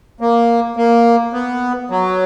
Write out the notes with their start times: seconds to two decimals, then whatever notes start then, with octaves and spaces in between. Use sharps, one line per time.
0.21 A#3
0.76 A#3
1.33 B3
1.90 F#3